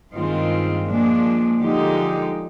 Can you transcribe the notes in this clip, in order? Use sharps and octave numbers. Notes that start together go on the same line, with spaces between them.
G2 D#3 G#3 C4 F4
A#2 F3 G#3 D4
D3 F3 G#3 D#4 G4